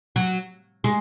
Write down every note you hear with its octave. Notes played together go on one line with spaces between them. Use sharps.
F#3
G#3